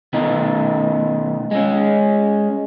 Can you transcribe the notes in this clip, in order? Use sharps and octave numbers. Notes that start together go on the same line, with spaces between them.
B2 D#3 A3 B3 D#4
G#3 C#4